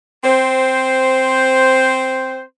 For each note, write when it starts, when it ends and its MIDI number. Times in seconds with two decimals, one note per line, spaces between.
0.23 2.41 60
0.23 2.41 72